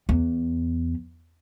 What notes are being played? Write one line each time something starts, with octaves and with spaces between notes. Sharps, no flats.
E2